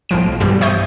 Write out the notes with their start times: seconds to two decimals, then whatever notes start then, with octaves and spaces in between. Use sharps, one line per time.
0.09 B1 A2 F3 D7
0.40 G2 B2 E3 G3
0.61 C5 E5 C#6 D#6 G6